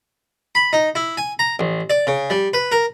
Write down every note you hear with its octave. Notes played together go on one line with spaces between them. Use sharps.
B5
D#4
E4
G#5
A#5
A1
D5
C#3
G3
B4
A#4